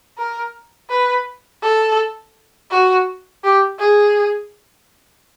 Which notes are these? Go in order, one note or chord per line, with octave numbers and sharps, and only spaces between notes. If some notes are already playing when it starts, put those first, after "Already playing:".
A#4
B4
A4
F#4
G4
G#4